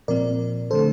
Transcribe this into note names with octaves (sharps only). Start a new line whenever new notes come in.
A#2 F3 C4 A#4 D5
D3 A3 A4 C5